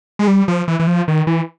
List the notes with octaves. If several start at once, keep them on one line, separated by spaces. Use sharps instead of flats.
G#3
G3
F3
E3
E3
F3
D#3
E3